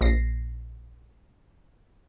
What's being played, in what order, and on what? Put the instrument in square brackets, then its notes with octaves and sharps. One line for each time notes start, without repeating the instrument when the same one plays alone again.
[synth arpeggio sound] A#1 A#6 C7